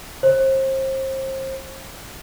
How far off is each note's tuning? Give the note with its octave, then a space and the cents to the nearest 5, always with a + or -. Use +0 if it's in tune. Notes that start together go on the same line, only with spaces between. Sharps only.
C5 +35